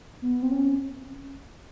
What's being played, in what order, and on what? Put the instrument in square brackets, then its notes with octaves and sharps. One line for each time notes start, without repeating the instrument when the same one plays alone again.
[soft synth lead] B3
C4
C#4